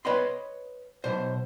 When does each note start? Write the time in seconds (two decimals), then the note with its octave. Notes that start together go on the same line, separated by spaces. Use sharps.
0.05 B4 C#5 D#5 G5 B5 C6
1.04 B1 B2 C5